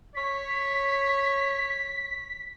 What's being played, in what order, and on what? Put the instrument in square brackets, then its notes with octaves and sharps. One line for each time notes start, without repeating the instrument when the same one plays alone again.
[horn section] C#5 [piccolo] B6